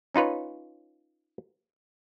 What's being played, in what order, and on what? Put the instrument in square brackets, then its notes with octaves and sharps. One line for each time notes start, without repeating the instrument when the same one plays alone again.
[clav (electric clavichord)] C#4 D#4 F4 B4 C#5